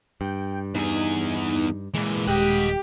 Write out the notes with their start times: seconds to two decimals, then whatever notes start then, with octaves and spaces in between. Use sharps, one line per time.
0.21 G2 G5
0.74 E2 D#4 G#4
1.94 A#2 E3 G#3
2.27 D#1 G4 D#5 F#5